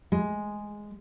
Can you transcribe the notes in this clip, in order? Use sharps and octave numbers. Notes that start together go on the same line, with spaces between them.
G#3